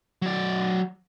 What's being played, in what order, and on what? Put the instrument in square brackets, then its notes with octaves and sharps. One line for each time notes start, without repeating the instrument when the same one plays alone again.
[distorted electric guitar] F#3 D5